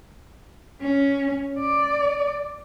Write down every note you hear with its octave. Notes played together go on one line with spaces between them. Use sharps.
C#4
D5